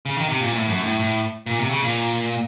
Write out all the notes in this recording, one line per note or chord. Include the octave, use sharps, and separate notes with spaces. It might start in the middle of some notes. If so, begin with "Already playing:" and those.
C#3
D#3
C3
A#2
A2
F#2
A2
A2
A#2
C3
C#3
A#2